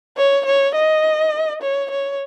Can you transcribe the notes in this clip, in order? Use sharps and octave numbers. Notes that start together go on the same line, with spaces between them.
C#5
C#5
D#5
C#5
C#5